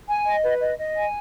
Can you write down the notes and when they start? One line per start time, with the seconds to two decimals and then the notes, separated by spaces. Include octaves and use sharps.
0.08 G#5
0.26 D#5
0.44 B4
0.60 D#5
0.78 D#5
0.96 G#5